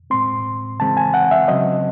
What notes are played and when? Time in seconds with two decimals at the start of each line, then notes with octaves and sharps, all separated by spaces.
0.10 A2 G#3 C4 C6
0.80 C#3 E3 G#3 C4 A5
0.97 G#5
1.14 F#5
1.31 E5
1.48 C#3 F#3 C4 D#5